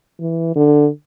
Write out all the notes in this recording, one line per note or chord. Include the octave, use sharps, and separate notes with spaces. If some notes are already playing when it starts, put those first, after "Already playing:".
E3
D3